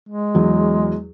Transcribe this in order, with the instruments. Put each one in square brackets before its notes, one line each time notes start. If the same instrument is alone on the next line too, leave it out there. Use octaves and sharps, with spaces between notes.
[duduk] G#3
[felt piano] E2 F#3